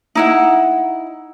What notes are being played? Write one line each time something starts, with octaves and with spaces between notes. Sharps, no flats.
D#4 E4 F#5